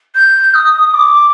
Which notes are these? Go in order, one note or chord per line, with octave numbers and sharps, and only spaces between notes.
G6
D#6
D6